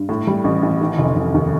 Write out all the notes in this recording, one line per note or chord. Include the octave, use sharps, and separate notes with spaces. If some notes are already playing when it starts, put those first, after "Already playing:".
Already playing: G2
A2
G3
A1
A1
D#3
F1
F1
D#2